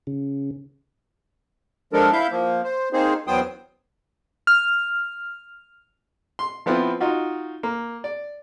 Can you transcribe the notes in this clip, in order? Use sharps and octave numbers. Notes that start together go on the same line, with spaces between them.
C#3
F3 G#3 D4 A4 A#4
E4 E5 F5 G6
F3 A#3
C5
A#3 C4 D#4 G#4 C5
E2 F#3 B3 C5 G5 D#6
F6
C6
F3 B3 C4 E4 F4
D#4 F4 F#4
A#3
D5